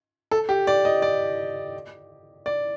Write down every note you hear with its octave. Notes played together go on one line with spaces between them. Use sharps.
A4
G4
D5
D#5
D5
D5